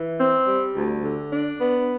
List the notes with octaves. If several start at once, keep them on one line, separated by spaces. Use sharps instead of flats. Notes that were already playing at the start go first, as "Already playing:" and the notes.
Already playing: E3
C4
G3
D2
D3
D4
B3